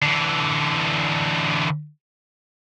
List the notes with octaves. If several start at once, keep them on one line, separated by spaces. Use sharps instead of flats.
D3 E3